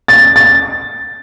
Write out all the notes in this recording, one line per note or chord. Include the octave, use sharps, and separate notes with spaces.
A6
A6